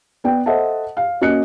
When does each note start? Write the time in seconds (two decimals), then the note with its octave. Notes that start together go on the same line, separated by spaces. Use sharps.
0.24 B3 D5 G5
0.46 A4 C5 D#5 E5 F#5 A5
0.97 F5
1.21 A#3 C#4 F#4 D#5 F#6 C#7